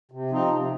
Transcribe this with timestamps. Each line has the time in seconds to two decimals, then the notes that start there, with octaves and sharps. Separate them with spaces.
0.12 C3
0.31 F3 C4 D#4
0.50 C3